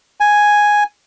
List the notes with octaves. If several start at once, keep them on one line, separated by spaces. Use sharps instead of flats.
G#5